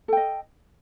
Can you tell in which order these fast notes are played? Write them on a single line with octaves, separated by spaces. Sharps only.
A4 G5 D#5